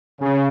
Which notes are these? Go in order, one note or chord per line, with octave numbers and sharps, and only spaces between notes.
C#3